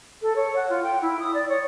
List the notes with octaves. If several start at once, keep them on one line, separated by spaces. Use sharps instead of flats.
A4
C#5
F#5
F4
G5
E4
D#6
D5
C#5